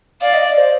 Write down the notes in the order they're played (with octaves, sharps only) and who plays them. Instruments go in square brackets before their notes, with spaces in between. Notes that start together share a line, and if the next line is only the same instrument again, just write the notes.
[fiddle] D5 [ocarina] F5
[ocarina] D#5
D5
C5